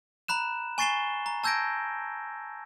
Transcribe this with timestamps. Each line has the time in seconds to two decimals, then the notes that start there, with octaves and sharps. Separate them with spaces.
0.28 A#5 B5 F#6 E7
0.78 G#5 C#6 A6 C7 E7 G7
1.26 A#5
1.44 A5 E6 G6 G#6 A#6 D7